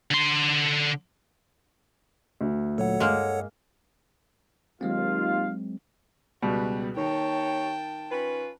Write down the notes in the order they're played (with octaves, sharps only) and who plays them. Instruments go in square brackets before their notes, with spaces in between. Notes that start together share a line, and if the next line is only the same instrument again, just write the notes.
[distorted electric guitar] D3 C6
[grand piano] D2
[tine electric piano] A#2 F#3 [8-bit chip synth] A4 C#5 F#5
[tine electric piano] G2 D#5 [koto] G#3 A#3
[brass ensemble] D#2 F4 F5 [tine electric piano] F#3 G#3 C4
[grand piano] C#2 B2 G3 [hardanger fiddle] F#4 B4
[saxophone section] D#2 C#5 [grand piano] D#3 [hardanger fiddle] G5 A5
[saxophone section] C#4 F4 B4